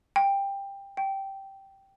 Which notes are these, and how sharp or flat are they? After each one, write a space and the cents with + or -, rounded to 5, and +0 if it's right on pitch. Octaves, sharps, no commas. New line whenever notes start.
G5 +15
G5 -10